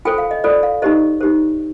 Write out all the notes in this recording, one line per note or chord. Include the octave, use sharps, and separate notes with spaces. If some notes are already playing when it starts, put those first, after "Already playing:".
F4 A4 C5 G5
F5
D#5
F4 A4 C5 D5
F5
D#4 G4 C5 D#5
D#4 G4 C5